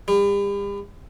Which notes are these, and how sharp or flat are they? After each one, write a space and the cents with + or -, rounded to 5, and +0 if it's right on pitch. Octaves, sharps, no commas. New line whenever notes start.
G3 +40